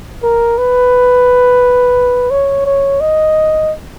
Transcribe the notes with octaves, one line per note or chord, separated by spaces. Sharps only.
A#4
B4
C#5
C#5
D#5